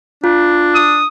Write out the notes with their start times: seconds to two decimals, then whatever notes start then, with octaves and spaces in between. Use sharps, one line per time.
0.24 D4 F4
0.75 D#6